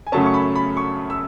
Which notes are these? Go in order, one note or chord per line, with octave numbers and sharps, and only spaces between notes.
G#5
F#2 C#3 F#3 A3 C#4 A5
C#6
B5
B5
C#6
E6